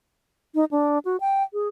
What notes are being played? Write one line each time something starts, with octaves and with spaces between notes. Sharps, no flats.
D#4
D4
F#4
G5
G#4